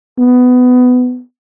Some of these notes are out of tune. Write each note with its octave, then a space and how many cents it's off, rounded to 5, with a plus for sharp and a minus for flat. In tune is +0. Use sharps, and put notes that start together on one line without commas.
B3 +15